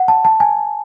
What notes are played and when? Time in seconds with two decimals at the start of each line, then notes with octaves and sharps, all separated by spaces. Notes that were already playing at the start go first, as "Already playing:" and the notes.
Already playing: F#5
0.08 A5
0.25 A5
0.40 G#5